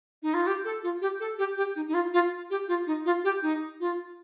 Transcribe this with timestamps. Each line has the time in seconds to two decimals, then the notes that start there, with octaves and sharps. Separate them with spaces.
0.23 D#4
0.34 F4
0.47 G4
0.65 A4
0.83 F4
1.01 G4
1.20 A4
1.38 G4
1.57 G4
1.76 D#4
1.88 D#4
1.94 F4
2.13 F4
2.50 G4
2.68 F4
2.87 D#4
3.05 F4
3.24 G4
3.42 D#4
3.80 F4